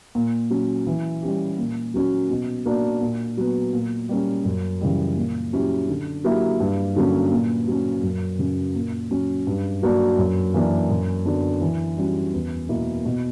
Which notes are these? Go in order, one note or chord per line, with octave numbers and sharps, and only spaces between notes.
A#2
F#3 C#4
E3
G3 C#4 G4
A#2
F#3 A#3 C#4 F#4
B2
A#3 D4 F#4
A#2
F#3 B3
A#2
G3 A#3 C#4
F#2
C#3 E3 G3
A#2
F#3 C#4 E4 G4
D3
F#3 A#3 E4 G4
G2
D3 F#3 A#3 C#4
A#2
F#3 C#4
F#2
C#3 F#3 C#4
A#2
F#3 C#4
G2
F#3 A#3 D4 F#4
F#2
E3 A#3 D4
F#2
D3 F#3 B3 D4
E3
G3 C#4 F#4
E2
B2 A#3 E4
B2